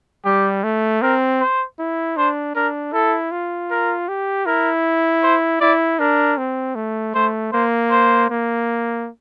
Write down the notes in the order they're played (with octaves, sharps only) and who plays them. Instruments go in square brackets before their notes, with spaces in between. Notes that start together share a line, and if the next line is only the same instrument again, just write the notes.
[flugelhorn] G3 [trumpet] G4
[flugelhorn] A3
[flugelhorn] C4 [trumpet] A#4
[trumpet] C5
[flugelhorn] E4
[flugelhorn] D4 [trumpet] C5
[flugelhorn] D4 [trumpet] A#4
[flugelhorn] E4 [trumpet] A4
[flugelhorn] F4
[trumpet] A#4
[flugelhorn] G4
[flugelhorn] E4 [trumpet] A#4
[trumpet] C5
[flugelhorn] E4 [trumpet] D5
[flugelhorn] D4 [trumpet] A#4
[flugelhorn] C4
A3
[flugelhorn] A3 [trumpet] C5
[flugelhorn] A#3 [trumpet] C5
[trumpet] C5
[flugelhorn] A#3